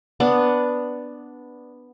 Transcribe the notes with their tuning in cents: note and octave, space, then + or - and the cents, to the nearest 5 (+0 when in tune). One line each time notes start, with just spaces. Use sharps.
B3 +0 D4 +0